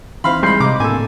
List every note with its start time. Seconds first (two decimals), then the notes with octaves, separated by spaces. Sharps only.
0.24 E3 C4 D#4 C5 F5 B5 C6
0.43 G3 G#3 B5 C6 G6 C7
0.60 C3 D#5 A#5 D6
0.80 G#1 A2 D3 A#3 A4 G#5